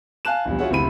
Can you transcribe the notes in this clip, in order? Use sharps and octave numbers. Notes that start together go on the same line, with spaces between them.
F5 G#5 A5 F#6 E7
A#1 E2 G3
F4 F#4 G#4 C#5 E5 F#5
F#1 D2 C3 E4 B5 D#7